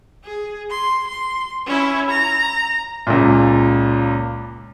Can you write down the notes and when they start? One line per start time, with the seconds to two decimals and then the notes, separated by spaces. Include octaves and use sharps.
0.24 G#4
0.70 C6
1.08 C6
1.66 C#4 E4
2.10 A#5
3.07 C#2 A#2